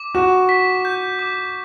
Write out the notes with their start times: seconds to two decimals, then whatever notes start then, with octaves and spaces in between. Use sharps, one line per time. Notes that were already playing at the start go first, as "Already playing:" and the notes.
Already playing: D6
0.15 F#4 E7
0.49 B6
0.85 G6
1.19 D6